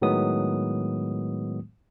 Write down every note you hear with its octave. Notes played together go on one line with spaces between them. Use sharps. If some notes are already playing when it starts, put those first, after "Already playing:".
A2 D#3 F#3 G#3 B3 D#6